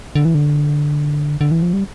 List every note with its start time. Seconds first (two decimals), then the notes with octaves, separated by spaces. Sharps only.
0.15 D3
0.25 E3
0.35 D3
1.41 D3
1.51 E3
1.62 F3
1.73 G3